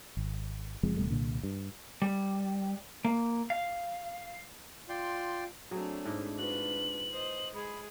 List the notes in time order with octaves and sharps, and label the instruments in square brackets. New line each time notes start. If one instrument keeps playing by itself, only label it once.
[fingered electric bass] G#1
F#1 F3 G#3 C4
D#1 B2 G3 A3
C2 A#2 D3
G2
[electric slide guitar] G3
A#3
F5
[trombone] F4 [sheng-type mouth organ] D5 G5 C6
[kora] F#3 G#4 [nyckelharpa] A3 C4 [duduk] D4
[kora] G#2 E4 D#5
[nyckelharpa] F4 B4 [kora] F#4 [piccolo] F#7
[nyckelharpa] C5 D#5
[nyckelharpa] G#3 G#4 [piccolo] B5